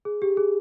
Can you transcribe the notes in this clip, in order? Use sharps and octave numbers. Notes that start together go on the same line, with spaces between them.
G#4
G4
G#4